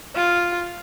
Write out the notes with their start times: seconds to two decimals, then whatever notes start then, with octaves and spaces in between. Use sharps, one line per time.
0.16 F4